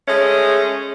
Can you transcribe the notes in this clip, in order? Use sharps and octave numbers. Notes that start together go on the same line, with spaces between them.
G#3 A3 C#4 G#4